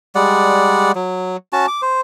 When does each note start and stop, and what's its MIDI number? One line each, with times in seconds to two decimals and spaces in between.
0.15 0.92 55
0.15 0.92 56
0.15 0.92 74
0.15 0.92 78
0.95 1.37 54
1.53 1.66 61
1.53 1.66 66
1.53 1.66 81
1.68 1.81 86
1.82 2.01 72